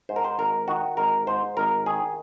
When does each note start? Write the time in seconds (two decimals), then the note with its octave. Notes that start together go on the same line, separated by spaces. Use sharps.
0.09 G#2 C5
0.16 A#4
0.24 C5
0.39 G#1 A#4
0.68 D#3 F#4
0.97 G#1 A#4
1.27 G#2 C5
1.57 G#1 A#4
1.86 D#3 G#4